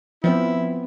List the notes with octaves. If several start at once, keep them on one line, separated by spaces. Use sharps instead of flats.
F3 B3 C4 E4